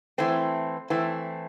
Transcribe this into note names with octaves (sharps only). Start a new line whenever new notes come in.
E3 A3 C4
E3 A3 C4